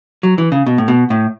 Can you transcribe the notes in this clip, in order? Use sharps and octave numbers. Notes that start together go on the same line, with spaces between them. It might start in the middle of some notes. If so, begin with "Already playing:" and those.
F#3
E3
C#3
B2
A2
B2
A2